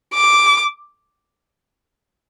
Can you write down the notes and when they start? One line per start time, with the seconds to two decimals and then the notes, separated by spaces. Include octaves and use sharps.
0.14 D6